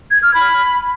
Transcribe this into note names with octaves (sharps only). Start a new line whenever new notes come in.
G#6
F6
B5